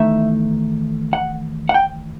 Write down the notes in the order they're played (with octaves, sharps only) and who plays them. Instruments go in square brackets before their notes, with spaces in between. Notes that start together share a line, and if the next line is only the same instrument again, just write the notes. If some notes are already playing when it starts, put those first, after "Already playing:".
Already playing: [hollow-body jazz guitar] E2 D#3 A3 D#4 E5
F#5
F#5
G5